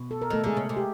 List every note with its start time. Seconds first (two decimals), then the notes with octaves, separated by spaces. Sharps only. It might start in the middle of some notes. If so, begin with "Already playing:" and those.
Already playing: B2
0.11 A4
0.22 A#4
0.30 D#3 A3 A4
0.44 D3 G#3 G#4
0.57 C#3
0.69 C3
0.77 G4